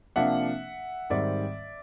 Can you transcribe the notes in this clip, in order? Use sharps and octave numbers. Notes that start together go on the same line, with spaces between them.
C3 F3 A#3 D4 E5 F#5
G#2 D#3 G3 C4 D5 E5